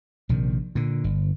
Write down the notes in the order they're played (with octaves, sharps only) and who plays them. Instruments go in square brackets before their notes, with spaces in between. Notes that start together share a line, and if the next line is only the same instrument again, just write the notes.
[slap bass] A#1 C3 D#3
A#2 D3
G1